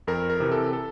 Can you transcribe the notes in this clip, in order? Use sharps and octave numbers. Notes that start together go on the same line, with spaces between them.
F2 A#4
A#4
C3 E3
A4
A4